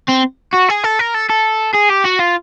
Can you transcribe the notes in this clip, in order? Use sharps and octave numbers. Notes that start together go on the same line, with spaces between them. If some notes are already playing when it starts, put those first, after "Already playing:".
C4
F#4
G#4
A4
A#4
A4
A4
G#4
G4
F#4
F4